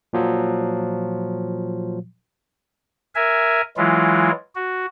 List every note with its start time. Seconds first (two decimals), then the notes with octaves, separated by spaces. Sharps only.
0.13 A#2 F3 F#3
3.15 A#4 E5 G#5
3.77 E3 F#3 G#3 E4 F4
4.55 F#4